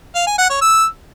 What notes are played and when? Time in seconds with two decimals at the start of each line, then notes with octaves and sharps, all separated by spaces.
0.15 F5
0.27 G#5
0.38 F#5
0.50 C#5
0.62 E6